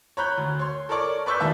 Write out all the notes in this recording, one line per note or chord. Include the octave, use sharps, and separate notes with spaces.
C#5 A#5 B5 F#6 G6
D2
C#5 C6
A4 A#4 C#5 D5 C#6
B4 D5 C#6 E6 G6 B6
D#2 B2 D#3 E5 A5